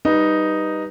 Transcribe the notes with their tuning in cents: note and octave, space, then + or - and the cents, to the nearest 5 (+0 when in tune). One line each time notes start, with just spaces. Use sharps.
G3 +0 D#4 +0 B4 -15